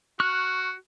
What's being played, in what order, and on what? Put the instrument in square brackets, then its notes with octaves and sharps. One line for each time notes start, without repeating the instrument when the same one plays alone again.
[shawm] F#4 [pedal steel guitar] C#6 F6 F#6